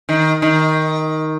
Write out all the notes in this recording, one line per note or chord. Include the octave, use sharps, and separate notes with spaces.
D#3
D#3